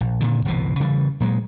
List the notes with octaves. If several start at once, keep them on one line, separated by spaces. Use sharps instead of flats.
A#1
A#2 D3 D#3
G1 C2 B2 E3
C#3 E3 G3
A#2 F#3 G#3